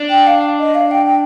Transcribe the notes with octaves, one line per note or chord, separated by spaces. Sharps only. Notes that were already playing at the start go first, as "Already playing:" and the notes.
Already playing: D4
G5
F5
D#5
F5
G5
G5